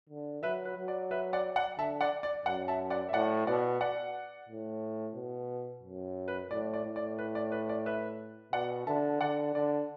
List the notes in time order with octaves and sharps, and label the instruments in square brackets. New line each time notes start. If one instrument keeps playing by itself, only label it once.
[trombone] D3
[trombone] F#3 [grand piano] B4 E5
[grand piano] B4
[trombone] F#3
[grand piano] D5
B4 E5
D5 F#5
D5 F#5
[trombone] D3 [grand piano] E5 A5
[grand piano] D5 F#5
D5
[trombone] F#2 [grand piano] D5 F#5
[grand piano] E5 A5
D5 F#5
E5
[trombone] A2 [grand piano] D5 F#5
[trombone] B2 [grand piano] D5 F#5
[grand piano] D5 F#5
[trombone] A2
B2
F#2
[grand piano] B4
[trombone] A2 [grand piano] D5
[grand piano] D5
[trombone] A2
[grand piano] D5
B4
D5
B4
D5
B4 E5
[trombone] B2 [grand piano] D5 F#5
[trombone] D3 [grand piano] E5 A5
[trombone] D3 [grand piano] D5 F#5
[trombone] D3 [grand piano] D5